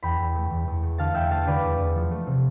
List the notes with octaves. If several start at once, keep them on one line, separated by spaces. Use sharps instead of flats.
E2 G5 B5
E2
A3
E2
E2
A3
D3 F5 A5
E2 E5 G5
A3 F5 A5
D3 B4 D5
E2
E2
F3
A3
C3